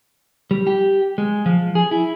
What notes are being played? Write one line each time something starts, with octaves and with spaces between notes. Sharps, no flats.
G3
G4
G#3
F3
G#4
E4